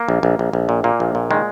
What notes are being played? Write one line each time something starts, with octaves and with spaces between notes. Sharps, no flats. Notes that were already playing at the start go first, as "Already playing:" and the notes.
Already playing: A#3
A#1
A#1
A#1
A#1
A#2
A#2 A#3
A#1
A#2
D#3 G#3